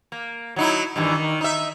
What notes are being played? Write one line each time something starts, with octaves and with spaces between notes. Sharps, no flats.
A#3
F#3 D#4 E4
G2 D#3 E3
D#3
D#4 E5